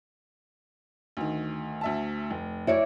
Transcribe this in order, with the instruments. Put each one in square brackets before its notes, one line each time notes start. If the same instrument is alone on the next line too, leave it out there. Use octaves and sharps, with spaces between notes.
[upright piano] D2 D#3
D2 E5 A5
F1
[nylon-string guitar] E4 C#5 D5